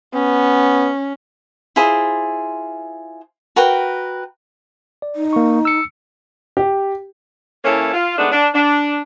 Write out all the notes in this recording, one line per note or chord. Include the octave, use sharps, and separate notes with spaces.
B3 C#4
E4 F4 G#4 C5
F#4 A#4 B4 G5
D5
D#4
A#3 C#6
E6 C#7
G4
E3 A#3 C#4 E4 A4 C#5
F4
D#3 G#3 A3 B3 D4
D4
D4